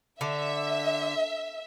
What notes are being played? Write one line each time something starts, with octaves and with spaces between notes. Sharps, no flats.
D3 E5